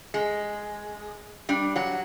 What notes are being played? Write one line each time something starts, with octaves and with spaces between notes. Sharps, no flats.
G#3
G3 D4
F#3 F#5